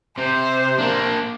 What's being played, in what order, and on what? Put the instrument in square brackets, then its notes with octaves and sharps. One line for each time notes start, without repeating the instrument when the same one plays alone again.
[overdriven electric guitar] C3 [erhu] C5
[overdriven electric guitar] A#3 D4